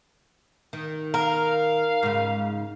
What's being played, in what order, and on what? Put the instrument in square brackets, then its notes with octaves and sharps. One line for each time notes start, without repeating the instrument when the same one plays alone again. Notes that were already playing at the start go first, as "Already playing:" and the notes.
[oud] D#3
[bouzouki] A#4 [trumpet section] F5
[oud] G#2 C#3